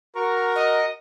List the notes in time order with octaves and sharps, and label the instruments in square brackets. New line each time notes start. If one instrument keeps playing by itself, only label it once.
[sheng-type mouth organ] F#4 A#5 C#6 [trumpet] A#4
[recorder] D#5